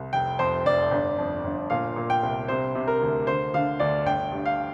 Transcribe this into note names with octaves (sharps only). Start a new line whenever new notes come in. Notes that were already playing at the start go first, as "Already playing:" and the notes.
Already playing: C2
F1 G5
F2 C5
F1 D5
G1
F2
G1
A#2 F5
A#2
G5
C2
C3 C5
C3
A#4
D2
D3 C5
D3 F5
D2 D5
G1 G5
G2
F5